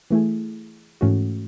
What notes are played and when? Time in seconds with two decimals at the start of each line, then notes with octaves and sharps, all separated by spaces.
0.11 E3 A3 E4 G#4
1.01 G#2 E3 A3 C#4 F#4